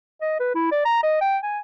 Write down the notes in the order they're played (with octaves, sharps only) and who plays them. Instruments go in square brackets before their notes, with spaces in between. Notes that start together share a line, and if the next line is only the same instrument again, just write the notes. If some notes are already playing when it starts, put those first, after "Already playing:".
[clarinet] D#5
B4
E4
D5
A#5
D#5
G5
G#5